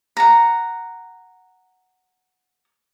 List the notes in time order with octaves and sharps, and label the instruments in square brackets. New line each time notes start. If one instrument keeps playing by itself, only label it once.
[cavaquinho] F#5 A#5